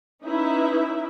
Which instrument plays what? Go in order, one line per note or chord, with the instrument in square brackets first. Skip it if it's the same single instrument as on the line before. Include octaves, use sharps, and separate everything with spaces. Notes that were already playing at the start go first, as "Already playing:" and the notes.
[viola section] C#4 D#4 E4 B4 E5